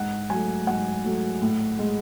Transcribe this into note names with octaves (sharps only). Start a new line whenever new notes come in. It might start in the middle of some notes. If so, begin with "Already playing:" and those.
Already playing: G#2 F#5
F#3 A3 G#5
G#2 F#5
F#3 A3
A2
G#3